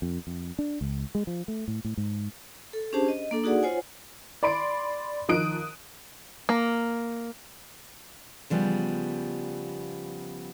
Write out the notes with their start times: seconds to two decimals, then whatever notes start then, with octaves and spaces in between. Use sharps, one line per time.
0.02 F2
0.27 F2
0.59 D4
0.81 C#2
1.15 G#3
1.27 F3
1.48 A3
1.68 A2
1.85 A2
1.97 G#2
2.73 A4
2.93 C#4 D4 G4 G#4 C5 A5
3.08 D#5
3.31 A#3 D4 A4
3.44 D#4 F#4 G#4 D5 F#5
3.63 F4 C5 C#5 F#5 G#5
4.43 D5 B5 C6 D7
5.28 D#3 F3 D#4 D#6 F#6 D7
6.49 A#3
8.50 C#3 F3 G3 B3